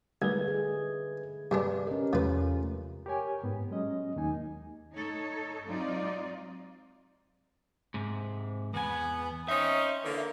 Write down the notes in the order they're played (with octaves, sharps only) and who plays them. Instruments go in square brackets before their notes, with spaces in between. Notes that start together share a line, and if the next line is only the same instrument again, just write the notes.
[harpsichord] C2 [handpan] D3 G#3 A3 [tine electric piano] B4 G#6
[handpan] G#4
[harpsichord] G2 G#3 D4 [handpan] C3 G4 B4
[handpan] C#4 A#4 [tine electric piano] D#5
[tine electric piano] E2 C3 [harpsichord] F3 B4 [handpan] G#3 A3 F4
[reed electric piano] G4 A#4 C#5 G#5
G#2 B3
F#3 G#3 C#4 D#5
D#2 A#3 D#4 G#5
[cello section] D#4 A4 C#5
F#3 G#3 C4 D#4 F4 D5
[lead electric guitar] G#2 C3
[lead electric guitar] E2 G#5 [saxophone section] B3
[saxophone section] C4 C#4 D#4 [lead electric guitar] E5
[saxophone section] D3 E3 A#3